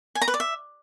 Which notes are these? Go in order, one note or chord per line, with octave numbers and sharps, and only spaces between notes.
G#5
A#5
B4
D5
E5